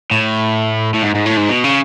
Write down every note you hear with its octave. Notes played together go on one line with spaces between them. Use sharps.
A2
A2
G#2
G#2
A2
G#2
B2
C#3